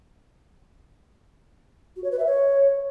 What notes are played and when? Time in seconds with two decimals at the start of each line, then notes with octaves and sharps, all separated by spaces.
1.96 F#4
2.04 C#5
2.11 B4
2.19 E5
2.27 C#5